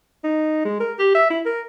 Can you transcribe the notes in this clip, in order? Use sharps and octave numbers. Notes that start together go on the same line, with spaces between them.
D#4
G#3
A#4
G4
E5
E4
A#4